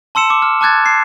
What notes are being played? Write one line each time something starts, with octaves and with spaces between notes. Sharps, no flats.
A5 C6 E6 C#7 E7
D6
F6
A5 D6 F#6 G#6 A6
C7